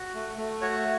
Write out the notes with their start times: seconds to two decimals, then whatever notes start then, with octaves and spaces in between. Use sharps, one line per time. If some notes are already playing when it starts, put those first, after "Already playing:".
Already playing: F#4
0.14 A3
0.38 A3
0.61 F#4 C#5